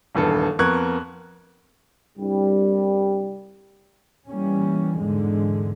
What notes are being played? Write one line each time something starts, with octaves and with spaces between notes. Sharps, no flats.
D#1 E2 G2 A4
F2 B3 A#4 C#6 F#6 G#6
C2 G2 G3
E3 G3 A#3 C#4
E2 G#2 D3 G#3